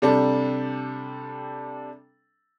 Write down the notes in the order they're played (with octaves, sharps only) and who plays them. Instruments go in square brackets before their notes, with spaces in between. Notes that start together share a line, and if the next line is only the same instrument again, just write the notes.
[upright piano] C3 G3 D4 A4